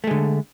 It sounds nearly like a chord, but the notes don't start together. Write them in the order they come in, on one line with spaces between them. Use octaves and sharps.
A3 G#3 D3